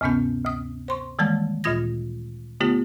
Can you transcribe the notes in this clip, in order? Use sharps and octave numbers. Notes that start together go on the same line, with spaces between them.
D2 G2 C3 B3 C#4 G6
D2 D#6
C5 C6 C#6
D#3 E3 G3 G#3 A#3 A5
D2 A#2 F4 D#6 G#6 A#6
D3 A3 B3 F4 G4